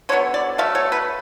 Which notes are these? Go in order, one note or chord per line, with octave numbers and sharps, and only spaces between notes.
D3 F#3 B3 C#5
D5
F#3 A3 F5
C#5
B4